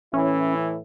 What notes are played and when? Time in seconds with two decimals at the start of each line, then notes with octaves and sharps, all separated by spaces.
0.14 A2 E3 C#4 E4